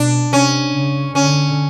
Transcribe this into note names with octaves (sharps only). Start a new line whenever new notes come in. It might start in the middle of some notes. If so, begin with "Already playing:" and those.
Already playing: B2 D4
C3 C#4
C#3
D3 C#4